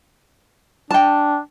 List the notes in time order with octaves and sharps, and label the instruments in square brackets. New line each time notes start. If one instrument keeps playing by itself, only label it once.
[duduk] D4 [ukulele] G5 A5